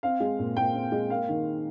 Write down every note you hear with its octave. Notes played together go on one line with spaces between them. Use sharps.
C4 F5
G#3
A#2
A#2 G5
C4
G#3
A#3 F5
D#3